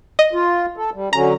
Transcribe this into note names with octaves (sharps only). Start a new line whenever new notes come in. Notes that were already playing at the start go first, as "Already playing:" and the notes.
D#5
F4
A4
G3
D3 F#3 C#4 A#5